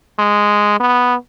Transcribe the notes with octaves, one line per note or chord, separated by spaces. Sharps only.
G#3
B3